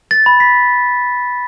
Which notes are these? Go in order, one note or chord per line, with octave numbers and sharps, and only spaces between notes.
A6
B5
B6